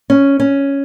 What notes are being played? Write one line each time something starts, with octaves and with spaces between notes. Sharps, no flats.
C#4
C#4